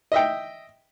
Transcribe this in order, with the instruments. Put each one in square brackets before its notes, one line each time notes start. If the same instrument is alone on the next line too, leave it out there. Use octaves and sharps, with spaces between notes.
[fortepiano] D#5 E5 G5